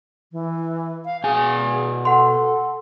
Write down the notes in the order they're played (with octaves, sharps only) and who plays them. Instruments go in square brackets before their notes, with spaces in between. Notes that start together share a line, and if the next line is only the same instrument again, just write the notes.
[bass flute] E3
F5
[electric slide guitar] B2 G#5 [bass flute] G#4
[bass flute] A4 [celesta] F#5 C6